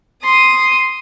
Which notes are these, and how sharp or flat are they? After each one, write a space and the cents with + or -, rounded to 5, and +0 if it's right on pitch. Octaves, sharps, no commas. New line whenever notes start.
C6 +0 D#6 +0